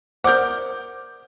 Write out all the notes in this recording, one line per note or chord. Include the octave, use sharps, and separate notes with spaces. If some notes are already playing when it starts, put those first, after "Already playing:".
A#4 C5 D5 F#5 D6 D#6 G6